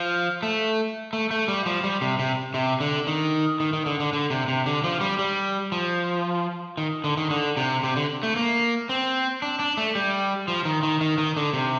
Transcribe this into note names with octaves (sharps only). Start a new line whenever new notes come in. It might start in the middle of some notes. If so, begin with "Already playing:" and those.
Already playing: F3
A3
A3
A3
G3
F3
G3
C3
C3
C3
D3
D#3
D#3
D#3
D3
D3
D3
C3
C3
D3
F3
G3
G3
F3
D#3
D3
D#3
D3
C3
C3
D3
A3
A#3
C4
D4
D4
A3
G3
F3
D#3
D#3
D#3
D#3
D3
C3